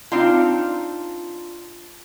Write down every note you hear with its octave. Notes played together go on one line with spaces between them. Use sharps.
C4 D4 D#4 F4